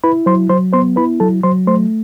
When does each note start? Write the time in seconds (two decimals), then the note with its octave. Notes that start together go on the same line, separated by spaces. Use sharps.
0.04 E4 B4 B5
0.26 F#3 C5 C6
0.49 F#3 C5 C6
0.73 B3 C5 C6
0.96 E4 B4 B5
1.20 F#3 A4 A5
1.43 F#3 C5 C6
1.67 A3 C5 C6